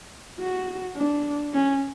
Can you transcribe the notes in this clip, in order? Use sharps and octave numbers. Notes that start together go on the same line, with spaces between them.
F#4
D4
C#4